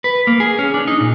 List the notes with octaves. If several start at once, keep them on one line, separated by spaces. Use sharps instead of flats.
B4
A#3
G#4
C#4
D4
D#4
A#2